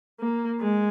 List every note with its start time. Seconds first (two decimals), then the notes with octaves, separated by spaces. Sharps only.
0.20 A#3
0.61 G#3